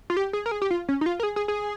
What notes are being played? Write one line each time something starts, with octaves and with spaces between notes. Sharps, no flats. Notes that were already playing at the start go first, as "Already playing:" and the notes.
F4
G4
G#4
A#4
G#4
G4
F4
C#4
D#4
F4
A#4
G#4
G#4
G#4